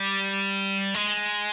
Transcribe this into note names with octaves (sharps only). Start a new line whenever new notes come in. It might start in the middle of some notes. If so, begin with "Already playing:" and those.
Already playing: G3
G#3